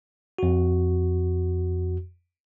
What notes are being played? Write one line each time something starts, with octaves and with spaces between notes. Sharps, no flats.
F2 F#4